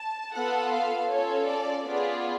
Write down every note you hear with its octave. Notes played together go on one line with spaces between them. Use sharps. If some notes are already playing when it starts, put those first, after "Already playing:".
Already playing: A5
B3 F4 A4 F#5
F5
C#4 F4 A4 C#5
D5
B3 F4 G#4 D5